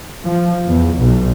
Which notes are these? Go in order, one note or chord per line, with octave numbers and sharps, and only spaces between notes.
F3
E2
B1